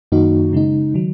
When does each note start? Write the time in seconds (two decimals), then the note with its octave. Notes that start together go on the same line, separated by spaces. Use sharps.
0.12 F#2 D#3 A#3 D#4 F#4
0.53 C#3 G#3 D#4
0.94 D#3 F#3